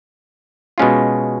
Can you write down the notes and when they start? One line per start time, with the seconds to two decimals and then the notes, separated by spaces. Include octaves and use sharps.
0.78 B2 G#3 C#4 F4